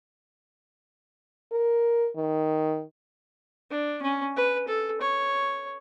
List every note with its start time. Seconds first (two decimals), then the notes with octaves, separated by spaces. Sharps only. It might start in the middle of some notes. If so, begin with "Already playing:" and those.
1.52 A#4
2.16 D#3
3.71 D4
4.02 C#4
4.37 B4
4.68 A4
5.01 C#5